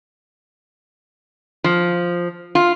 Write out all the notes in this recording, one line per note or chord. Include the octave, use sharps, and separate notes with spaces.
F3
F4